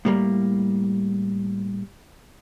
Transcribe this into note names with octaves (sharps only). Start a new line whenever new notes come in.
A2 G3 A#3